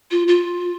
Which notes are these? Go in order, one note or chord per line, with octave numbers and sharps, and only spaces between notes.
F4
F4